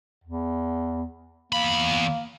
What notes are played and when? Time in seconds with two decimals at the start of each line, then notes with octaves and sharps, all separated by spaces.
0.24 E2
1.52 E2 A#3 B5